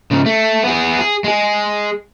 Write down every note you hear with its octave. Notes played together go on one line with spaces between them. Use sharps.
G#2 C#3
A3
B3 G#4
G#4
G#3 G#4